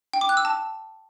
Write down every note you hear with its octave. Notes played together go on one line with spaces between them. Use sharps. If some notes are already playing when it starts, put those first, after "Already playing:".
G5
D6
F#6
E6
A5